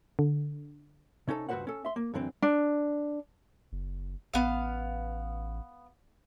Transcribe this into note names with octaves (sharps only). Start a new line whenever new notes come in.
D3
C3 C#4 D#4 A4
C#2 G2 F#4 B4 C5 F#5
C#4 A4
E5 C6
A#3
F#2 D3 E3 C4
D4
F#1
A1 B3 F5